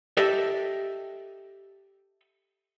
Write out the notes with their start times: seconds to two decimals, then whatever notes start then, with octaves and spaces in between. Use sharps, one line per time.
0.17 G4 A4 D#5 E5